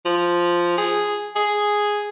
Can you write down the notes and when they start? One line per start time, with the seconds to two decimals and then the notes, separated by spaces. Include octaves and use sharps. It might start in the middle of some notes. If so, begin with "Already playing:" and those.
0.05 F3
0.78 G#4
1.35 G#4